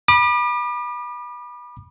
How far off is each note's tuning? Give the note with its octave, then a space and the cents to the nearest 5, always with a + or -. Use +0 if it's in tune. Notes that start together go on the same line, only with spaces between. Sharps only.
B5 -20 D6 +40